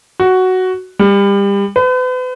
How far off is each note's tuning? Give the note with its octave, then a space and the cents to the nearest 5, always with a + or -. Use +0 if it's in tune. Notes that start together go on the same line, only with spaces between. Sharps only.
F#4 +5
G3 +30
B4 +40